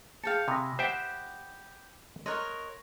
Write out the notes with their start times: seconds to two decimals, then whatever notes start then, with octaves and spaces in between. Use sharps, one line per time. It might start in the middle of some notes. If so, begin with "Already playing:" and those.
0.23 G#4 F5 G5 A5 C#7
0.48 C3 G#5 B5 D#6 A#6
0.79 G4 C5 E5 F#5 G5
2.26 A#4 C#5 D#5 C6 F#6